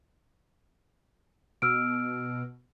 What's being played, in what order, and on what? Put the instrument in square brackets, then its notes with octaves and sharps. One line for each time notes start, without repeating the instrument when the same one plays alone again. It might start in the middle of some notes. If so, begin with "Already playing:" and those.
[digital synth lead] B2 [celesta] E6 F6 D7